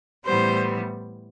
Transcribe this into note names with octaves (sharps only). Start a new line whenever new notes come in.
A2 E3 G3 B3 C5